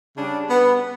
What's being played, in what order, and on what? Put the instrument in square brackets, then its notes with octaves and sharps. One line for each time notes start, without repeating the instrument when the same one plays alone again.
[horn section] C#3 G3 D4
B3